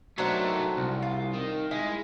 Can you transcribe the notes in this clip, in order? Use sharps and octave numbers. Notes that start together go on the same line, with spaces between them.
D#3 F#3 A3 D4 C5
C2
F4
D#3
G#3 E4